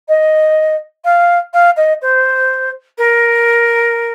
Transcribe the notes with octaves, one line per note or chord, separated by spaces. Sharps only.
D#5
F5
F5
D#5
C5
A#4